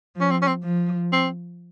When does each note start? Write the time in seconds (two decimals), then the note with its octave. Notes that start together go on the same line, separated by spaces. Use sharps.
0.16 F3 C#4
0.31 C4
0.42 C#4
0.48 C4
0.63 F3
1.13 C4